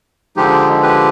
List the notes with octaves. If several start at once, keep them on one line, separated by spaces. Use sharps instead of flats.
D3 F3 G#3 D#4 G4
G4 B4